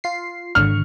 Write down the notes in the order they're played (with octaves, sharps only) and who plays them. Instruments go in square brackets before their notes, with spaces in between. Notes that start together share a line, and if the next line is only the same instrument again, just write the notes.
[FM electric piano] F4 C7
[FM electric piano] G#1 D3 C#6 [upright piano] F6